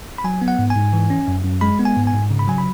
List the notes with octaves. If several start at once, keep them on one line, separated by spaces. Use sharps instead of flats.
B5
F#3 G#5
B3
F#5
G#2
G#5
G#2
E3
C#4
F#2
F#2
G#3 B5
B3
G#5
G#2
G#5
G#2
C#3
B5
F#3 G#5
B5